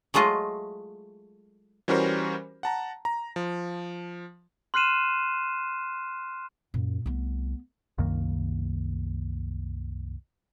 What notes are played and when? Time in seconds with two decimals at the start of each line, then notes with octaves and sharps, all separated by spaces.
0.14 F#3 G#3 A3 F4 D#5
1.88 E3 G3 C#4 F#4 A#4 C5
2.63 F#5 A5 A#5
3.05 A#5
3.36 F3
4.74 C6 F6 F#6 C7 D#7 E7
6.74 F#2 A#2
7.06 C2 A3 B3
7.98 C2 F#2 D#3 A#3